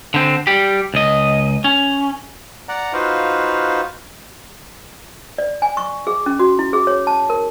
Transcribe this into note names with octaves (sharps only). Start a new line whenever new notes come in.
D3 C4
G3 G4
C#2 D#5
C#4
D5 F#5 A#5
D#4 F4 F#4 B4 C5 F5
D5
G#5
C#6
G#4
C#4
F#4
E4
G#4
C#5
A5
A#4